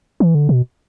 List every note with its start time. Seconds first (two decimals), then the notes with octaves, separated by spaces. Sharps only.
0.20 E3
0.35 D3
0.49 B2